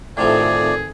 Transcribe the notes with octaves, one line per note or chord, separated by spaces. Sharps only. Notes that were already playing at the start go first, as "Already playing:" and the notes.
A2 C3 D#3 F3 C4 G#4 A4 D5